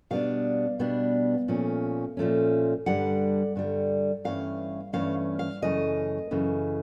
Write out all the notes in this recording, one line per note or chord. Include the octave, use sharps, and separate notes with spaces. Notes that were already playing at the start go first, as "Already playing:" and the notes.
B2 G3 B3 D4 F5
B2 G3 B3 D4
A#2 F3 A3 C#4
A#2 F3 A3 C#4
G2 D3 G3 F#5
G2 D3 G3
G2 E3 A3 C#4 F5
G2 E3 A3 C#4 F5
F5
F#2 C#3 E3 A3 D#5
F#2 C#3 E3 A3